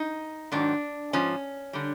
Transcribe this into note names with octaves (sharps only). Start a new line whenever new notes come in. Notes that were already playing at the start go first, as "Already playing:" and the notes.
Already playing: D#4
G#2 D#3 F#3 D4
G#2 F3 C#4
D3 G3